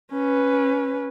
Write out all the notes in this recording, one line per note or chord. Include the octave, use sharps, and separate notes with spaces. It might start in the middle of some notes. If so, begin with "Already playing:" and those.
C#4 B4